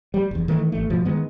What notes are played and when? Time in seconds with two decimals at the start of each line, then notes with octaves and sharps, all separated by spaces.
0.14 G3
0.31 F1 E2
0.48 D#3 E3 A3
0.72 A1 A3
0.90 G2 B2 F3
1.05 D#3 G#3 B3